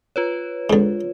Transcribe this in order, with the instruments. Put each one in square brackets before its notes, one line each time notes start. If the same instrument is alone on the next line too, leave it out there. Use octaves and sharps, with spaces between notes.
[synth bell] F4 B4 C#5
[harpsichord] G#2 D3